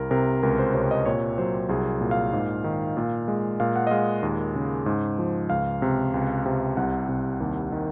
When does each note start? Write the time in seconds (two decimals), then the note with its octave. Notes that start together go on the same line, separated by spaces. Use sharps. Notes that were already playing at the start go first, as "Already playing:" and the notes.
Already playing: C2 A#4
0.11 C3 A#4
0.43 C#2 A#4
0.59 C5
0.74 C3 C#5
0.91 D#5
1.06 A#2 C#5
1.38 F#3 C5
1.69 C2 G#4
2.01 A#2
2.11 F5
2.33 G#2
2.64 D#3
2.97 A#2
3.28 G#3
3.60 A#2 F5
3.76 F#5
3.87 D#5
3.91 G#3 F5
4.23 D#2
4.55 C#3
4.86 G#2
5.19 F3
5.50 C#2 F5
5.82 C3
6.14 C#2
6.46 C3
6.77 C2 F#5
7.09 C3
7.41 D#2
7.72 D#3